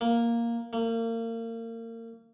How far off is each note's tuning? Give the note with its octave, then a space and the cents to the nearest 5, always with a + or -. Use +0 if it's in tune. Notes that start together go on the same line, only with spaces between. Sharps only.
A#3 +0
A#3 -35